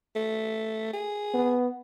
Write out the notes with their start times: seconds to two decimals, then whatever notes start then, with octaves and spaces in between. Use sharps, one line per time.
0.15 A3
0.93 G#4
1.34 B3